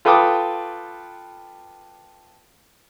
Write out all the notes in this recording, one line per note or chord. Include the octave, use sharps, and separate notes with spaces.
F4 A4 B4 G5 D6 D#6